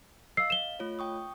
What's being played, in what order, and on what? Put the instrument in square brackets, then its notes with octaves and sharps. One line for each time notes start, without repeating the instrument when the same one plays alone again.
[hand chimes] D#5 F5 [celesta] E6 C7
[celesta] E7 G7
[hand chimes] A3 F4 C#5
G5 C#6 D#6